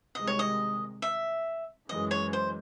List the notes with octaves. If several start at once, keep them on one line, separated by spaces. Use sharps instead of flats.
C2 C3 D#3 G#3 D#5
C#5
D#5
E5
F#2 E3 G#3 D#5
C#5
C5